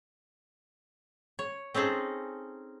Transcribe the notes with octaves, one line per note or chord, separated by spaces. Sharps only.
C#5
C4 C#4 D#4 G#4 A4